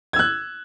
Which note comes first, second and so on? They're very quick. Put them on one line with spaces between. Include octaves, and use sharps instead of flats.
G#6 E6 F#6